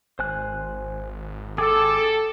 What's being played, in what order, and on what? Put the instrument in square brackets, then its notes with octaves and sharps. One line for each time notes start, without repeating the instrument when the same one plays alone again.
[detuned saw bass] G#1 [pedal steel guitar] C5 G#5 F#6
[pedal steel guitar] G#4 G5 E6 [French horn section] A4 [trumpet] D6